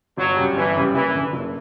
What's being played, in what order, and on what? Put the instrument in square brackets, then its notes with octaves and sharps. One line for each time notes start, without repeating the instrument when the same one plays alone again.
[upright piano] G1 [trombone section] F#3
[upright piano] F#2 C#3 G3
[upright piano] G1 [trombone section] E3
[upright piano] F#2 C#3 G3
[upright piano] F#1 [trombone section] E3
[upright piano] F#2 D3
F#1